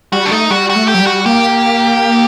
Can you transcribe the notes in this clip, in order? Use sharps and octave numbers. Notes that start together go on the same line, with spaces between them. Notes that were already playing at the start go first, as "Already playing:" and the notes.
G3 F#4
D4
A3 D#4
G3 F#4
F#4
A3
G4
F#3
G3
F#4
A#3 G4